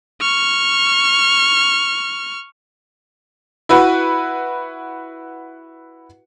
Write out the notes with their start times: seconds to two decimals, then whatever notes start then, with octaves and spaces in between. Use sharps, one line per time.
0.21 C#6 F6
3.69 E4 F#4 B4 F#5